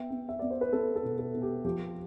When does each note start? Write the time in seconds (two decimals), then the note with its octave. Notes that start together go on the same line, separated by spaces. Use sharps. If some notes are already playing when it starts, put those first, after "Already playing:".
Already playing: B3 E5 G5
0.11 B3
0.29 E5
0.39 B3 D5
0.50 C5
0.61 B4
0.73 B3 A4
0.96 A4
1.03 B2
1.19 A4
1.34 B2
1.42 G4
1.65 F3 G4